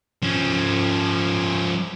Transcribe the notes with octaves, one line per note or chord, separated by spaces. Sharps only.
F3 C#4